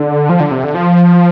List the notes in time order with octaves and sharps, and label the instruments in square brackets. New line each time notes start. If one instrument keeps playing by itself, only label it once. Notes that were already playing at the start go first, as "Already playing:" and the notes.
Already playing: [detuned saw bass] D3
F3
D3
C3
D3
F3